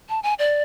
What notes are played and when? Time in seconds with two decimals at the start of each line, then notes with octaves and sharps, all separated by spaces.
0.09 A5
0.23 G#5
0.39 D5